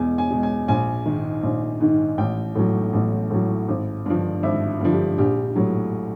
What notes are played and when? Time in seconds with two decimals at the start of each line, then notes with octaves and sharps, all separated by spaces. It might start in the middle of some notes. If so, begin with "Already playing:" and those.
Already playing: E2 B2 G#3 G#5
0.18 G#5
0.31 B2 G#3
0.43 G#5
0.68 A#1 G#5
1.06 G#2 D#3
1.43 A#1
1.80 G#2 D#3
2.18 A1 G5
2.55 A2 F#3
2.93 A1
3.31 A2 F#3
3.68 G#1
4.06 G2 D3 F3
4.43 G#1 E5
4.80 G2 D3 F3
4.93 G4
5.18 A#1 G4
5.56 A2 F#3